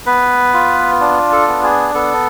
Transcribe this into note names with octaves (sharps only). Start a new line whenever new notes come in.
B3 B4
F4
D4
A4
B3
G#4
B3 A4